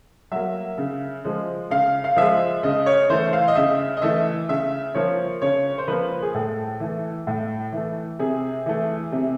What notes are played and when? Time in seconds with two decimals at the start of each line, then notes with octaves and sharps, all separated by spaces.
0.32 F#3 A#3 E5
0.78 C#3
1.24 F3 G#3
1.71 C#3 F5
2.04 F5
2.16 F3 G#3 E5
2.63 C#3 D#5
2.86 C#5
3.09 E3 A3 C5
3.33 F5
3.48 D#5
3.55 C#3 E5
3.97 D#5
4.02 E3 A3 E5
4.49 C#3 E5
4.95 F3 A#3 C#5
5.41 C#3 C#5
5.78 C5
5.88 F3 A#3 B4
6.22 G#4
6.34 A2 A4
6.80 E3 A3
7.27 A2
7.72 E3 A3
8.19 C3 G#4
8.66 E3 A3
9.12 C3